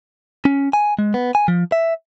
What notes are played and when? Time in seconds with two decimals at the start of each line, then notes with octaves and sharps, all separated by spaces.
0.45 C#4
0.73 G#5
0.99 G#3
1.14 B3
1.35 G#5
1.48 F3
1.72 E5